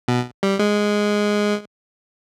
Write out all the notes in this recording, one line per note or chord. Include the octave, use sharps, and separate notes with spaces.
B2
G3
G#3